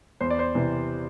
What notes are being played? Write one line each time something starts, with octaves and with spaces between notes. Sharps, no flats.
E2 C5
D5
C5
C3 E3